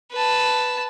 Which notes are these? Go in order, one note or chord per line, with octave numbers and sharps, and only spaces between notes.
B4 A5